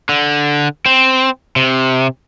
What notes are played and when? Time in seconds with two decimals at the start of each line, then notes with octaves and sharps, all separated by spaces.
0.09 D3
0.86 C4
1.56 C3